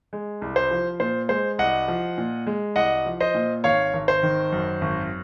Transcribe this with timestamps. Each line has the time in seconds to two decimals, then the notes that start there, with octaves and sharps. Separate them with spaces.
0.13 G#3
0.42 C2
0.56 C5
0.71 F3
1.00 A#2 C5
1.29 G#3 C5
1.59 C2 D#5 F#5
1.88 F3
2.18 A#2
2.47 G#3
2.76 C2 D#5 F#5
3.06 F3
3.20 C5 D#5
3.35 A#2
3.64 G#1 C#5 F5
3.93 G#1
4.08 C5
4.23 D#3
4.52 F#2
4.81 G#1